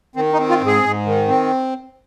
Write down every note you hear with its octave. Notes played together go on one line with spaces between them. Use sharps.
D#3 C4
D#4
C4
F4
G#2
G#4
G#2
D#3
C4